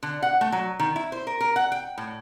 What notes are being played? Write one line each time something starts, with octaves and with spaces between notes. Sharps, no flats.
D3
F#5
A3
F#3
D#3
E4
C5
A#4
A#4
F#5
G5
A2